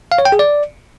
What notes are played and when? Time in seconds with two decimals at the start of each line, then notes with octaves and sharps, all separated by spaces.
0.12 F5
0.18 C#5
0.25 G5
0.32 G#4
0.39 D5